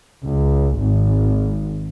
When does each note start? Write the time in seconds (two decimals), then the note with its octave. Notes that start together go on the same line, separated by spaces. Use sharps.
0.25 C#2
0.80 G#1